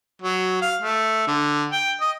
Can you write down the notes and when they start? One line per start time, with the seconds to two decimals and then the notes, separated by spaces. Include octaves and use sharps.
0.22 F#3
0.62 F5
0.81 A3
1.27 D3
1.72 G5
2.01 D#5